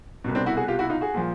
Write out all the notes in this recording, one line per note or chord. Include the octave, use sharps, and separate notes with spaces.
C2 B2
C4 D4
E4 F#4
F#4 G#4
F4 G4
E4 F#4
D#4 F4
F#4 G#4
A#2 F3